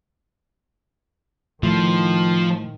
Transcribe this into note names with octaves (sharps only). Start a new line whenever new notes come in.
A2 D#3 F3